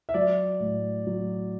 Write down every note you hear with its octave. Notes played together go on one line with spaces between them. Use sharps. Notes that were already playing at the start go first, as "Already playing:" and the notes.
E5
F#3 D5
A2
F#3